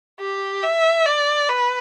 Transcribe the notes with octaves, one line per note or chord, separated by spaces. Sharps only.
G4
E5
D5
B4